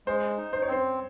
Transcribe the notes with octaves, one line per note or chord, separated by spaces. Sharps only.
G#3 C5
D#4
C5
C#5
C4 C5